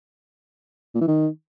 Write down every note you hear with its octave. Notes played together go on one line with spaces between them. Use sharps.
A#2
E3
D#3